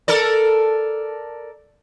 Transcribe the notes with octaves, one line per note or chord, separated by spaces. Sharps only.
A4 A#4 D5